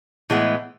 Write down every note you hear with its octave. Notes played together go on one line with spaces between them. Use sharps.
A2 E3 G#3 B3